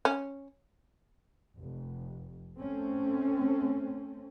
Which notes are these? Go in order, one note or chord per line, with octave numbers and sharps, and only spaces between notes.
C#4
F1
A3 C4 C#4